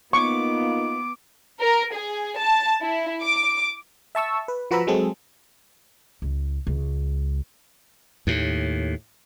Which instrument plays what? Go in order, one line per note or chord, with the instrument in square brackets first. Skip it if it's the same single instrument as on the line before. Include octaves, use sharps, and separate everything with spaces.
[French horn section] A#3 D#4 F4 [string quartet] B3 [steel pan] C#6 [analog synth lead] D6
[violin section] A#4
G#4
A5
E4
D6
[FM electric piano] E5 A5 C#6 E6
B4
F3 F#4 B4 A#5 B5 E6
F#3 G#3 C4 G#4 A4
[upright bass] C#2
C#2
[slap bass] D#2 A2